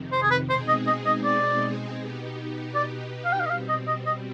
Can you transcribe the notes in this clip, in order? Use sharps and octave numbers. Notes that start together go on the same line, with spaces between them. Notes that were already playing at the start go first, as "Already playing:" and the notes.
Already playing: F2 C3 D#3
C5
G#4
B4
B2 G#3 C4 D#4 G#4 C5
D#5
D#5
D#5
D5
B2 B3 D#4 G4
D5
F5
G5
F5
D#5
B2 G3 C4 F5
D#5
D#5
D#5